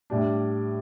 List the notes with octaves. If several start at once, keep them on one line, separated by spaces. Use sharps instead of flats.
A2 G3 D4